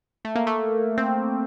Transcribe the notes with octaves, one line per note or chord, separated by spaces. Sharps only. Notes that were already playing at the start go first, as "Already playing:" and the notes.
A3
A#3
A3
C4